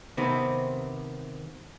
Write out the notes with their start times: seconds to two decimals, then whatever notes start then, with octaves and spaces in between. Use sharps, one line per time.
0.17 C3 D#3 B3 C4